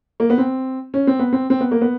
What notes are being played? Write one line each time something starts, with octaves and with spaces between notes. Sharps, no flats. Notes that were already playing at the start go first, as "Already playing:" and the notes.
A#3
B3
C4
C#4
C4
B3
C4
C4
B3
A#3
B3